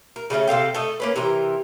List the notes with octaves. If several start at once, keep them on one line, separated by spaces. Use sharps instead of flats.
A#4
C#3 G3 A3 C#4
C3 A4 F5 G5
A3 A4 D#5
A#3 C#4 B4
C3 E3 A#4 A#5